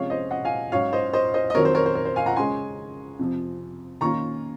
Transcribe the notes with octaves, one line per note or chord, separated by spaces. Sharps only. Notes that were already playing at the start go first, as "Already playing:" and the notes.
Already playing: C3 F3 G#3 C#4 C#5 F5
C5 D#5
D#5 F#5
F5 G#5
G#2 F#3 C#4 C#5 F5
C5 D#5
C5 D#5
C5 D#5
D#5
F2 D#3 F#3 C4 D#4 A#4 C#5
C5
A#4 C#5
C5
A#4
C5
F5 G#5
F#5 A#5
C#3 G#3 C#4 G#5 C6
F2 C3 F3
D#3 A#3 C#4 F4 A#5 C#6